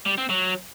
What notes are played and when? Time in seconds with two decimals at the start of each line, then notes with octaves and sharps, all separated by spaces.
0.06 G3
0.18 C4
0.30 F#3